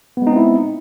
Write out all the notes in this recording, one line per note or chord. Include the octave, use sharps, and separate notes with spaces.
G#3 B3 C4 D#4 E4